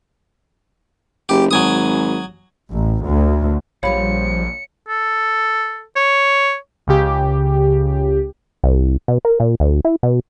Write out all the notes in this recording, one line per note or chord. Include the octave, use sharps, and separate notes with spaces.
F#1 G4
G#1 F#3 G#5 D#6
A1
D2
A#1 F3 G3 F4 C#5 F5 B5 C#7
A4
C#5
C#2 C#3 G4
C2
B2
A#4
A#2
D2
E4
B2